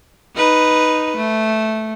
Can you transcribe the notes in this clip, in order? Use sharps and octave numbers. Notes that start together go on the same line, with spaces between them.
D#4 B4
A3